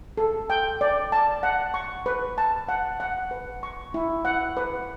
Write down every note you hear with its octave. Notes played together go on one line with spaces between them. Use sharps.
A4
G5
D5
A5
F#5
C#6
B4
A5
F#5
F#5
B4
C#6
E4
F#5
B4